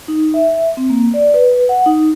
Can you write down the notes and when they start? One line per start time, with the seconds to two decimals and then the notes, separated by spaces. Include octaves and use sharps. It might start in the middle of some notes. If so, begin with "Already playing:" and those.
0.08 D#4
0.34 E5
0.77 C4
0.90 A#3
1.14 D5
1.34 B4
1.69 F#5
1.86 D#4